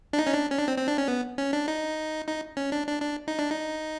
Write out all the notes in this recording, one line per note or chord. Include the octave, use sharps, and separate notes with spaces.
D4
D#4
C#4
D4
C#4
D4
C4
C4
D4
C#4
B3
C#4
D4
D#4
D#4
C#4
D4
D4
D4
D#4
D4
D#4